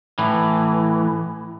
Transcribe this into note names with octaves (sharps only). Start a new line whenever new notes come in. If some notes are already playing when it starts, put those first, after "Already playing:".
A2 E3